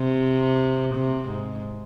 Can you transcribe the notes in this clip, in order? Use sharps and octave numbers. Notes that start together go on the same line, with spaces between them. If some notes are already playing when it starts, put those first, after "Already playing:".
Already playing: C3
C3
G#2